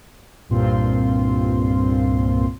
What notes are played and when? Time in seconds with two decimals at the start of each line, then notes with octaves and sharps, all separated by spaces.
0.49 C2 G2 A#2 C4 F4 C6